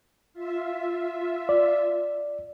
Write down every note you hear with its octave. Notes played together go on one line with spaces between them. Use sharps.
F4 E5
D5